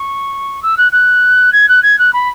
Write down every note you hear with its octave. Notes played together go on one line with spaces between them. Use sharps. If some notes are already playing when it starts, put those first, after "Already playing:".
Already playing: C#6
E6
F#6
F#6
G#6
F#6
G#6
F#6
B5